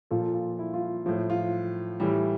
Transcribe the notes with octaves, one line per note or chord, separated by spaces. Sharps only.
A#2 F3 F4 A4
F4
E4
F4
A2 F3
F4
A2 E3 G3